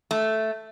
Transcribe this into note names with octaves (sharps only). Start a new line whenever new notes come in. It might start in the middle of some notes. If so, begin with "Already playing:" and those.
A3